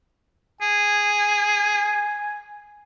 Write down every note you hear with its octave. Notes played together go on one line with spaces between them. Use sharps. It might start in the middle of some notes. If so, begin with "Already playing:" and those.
G#4 G#5